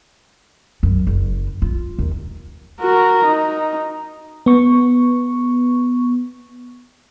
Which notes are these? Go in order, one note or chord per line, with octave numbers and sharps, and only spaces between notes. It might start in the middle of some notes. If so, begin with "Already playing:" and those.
F#2
F#1
F4
D#2
F#4 A#4
D#4
B3 C#6